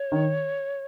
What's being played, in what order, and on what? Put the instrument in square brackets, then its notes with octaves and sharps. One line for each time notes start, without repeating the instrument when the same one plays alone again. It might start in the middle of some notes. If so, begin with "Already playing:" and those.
Already playing: [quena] C#5
[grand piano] D#3